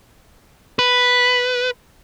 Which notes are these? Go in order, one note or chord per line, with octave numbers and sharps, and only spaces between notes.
B4